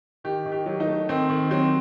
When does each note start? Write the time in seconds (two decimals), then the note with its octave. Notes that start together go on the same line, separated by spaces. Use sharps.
0.24 D#3 G4
0.45 D#3
0.52 G4
0.66 F#3
0.80 D#4
0.87 A3
1.09 D#3 C4
1.29 D#3
1.51 F#3 C4